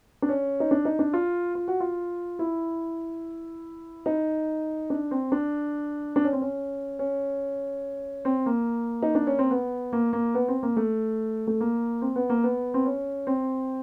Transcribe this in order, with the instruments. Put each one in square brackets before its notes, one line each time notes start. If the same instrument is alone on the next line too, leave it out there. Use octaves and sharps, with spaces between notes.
[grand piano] D4
C#4
D#4
D4
D#4
D4
F4
F4
F#4
F4
E4
D#4
D4
C4
D4
D4
C#4
C4
C#4
C#4
C4
A#3
D#4
D4
C#4
C4
B3
A#3
A#3
B3
C4
A#3
A3
A3
A#3
C4
B3
A#3
B3
C4
C#4
C4